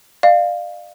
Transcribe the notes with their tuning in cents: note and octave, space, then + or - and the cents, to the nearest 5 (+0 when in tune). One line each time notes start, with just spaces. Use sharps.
D5 +40 F5 +0